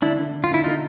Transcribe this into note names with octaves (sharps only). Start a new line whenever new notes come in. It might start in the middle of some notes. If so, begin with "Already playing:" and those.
D3 D4 E4
D3
D3
F4
D3 E4
D3 D#4 F4